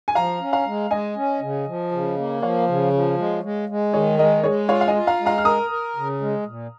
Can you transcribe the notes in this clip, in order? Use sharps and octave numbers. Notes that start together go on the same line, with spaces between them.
G#5
F3 F5 A#5
C#4
F5 A#5
G#3
G#3 D#5 G#5
C#4
C#3
F3
C#3
A#3
F3 C#5 F5
C#3
F3
G#3
G#3
G#3
D#3 G#4 C#5
G#3 A#4 D#5
G#3 G#4 C#5
F4 C#5 F5
F5
D#5 G#5
F4
F5 A#5
G#3
F5 A#5
F6
A#4 A#5 D#6
A#4
C#3
G#3
A#2